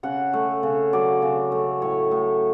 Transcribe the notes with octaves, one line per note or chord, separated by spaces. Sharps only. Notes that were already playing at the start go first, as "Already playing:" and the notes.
C#3 F#5
A3
C#3
F#3 D5
C#3
A3
A2 C#5
A2